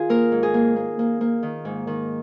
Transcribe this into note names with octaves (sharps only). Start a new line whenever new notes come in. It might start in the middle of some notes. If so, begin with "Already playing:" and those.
Already playing: D#3 F4 G#4
A#3 A#4
G#2
G#4
A#3
A#3
A#3
A#3
D#3
G#2
D#3